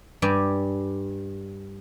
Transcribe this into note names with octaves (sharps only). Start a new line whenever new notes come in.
G2 G4 D5 G#5